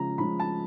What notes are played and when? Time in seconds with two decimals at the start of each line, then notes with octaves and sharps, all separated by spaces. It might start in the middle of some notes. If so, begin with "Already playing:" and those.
Already playing: C#3 F3 G#3 A#5
0.18 C#3 F3 G#3 B5
0.40 A5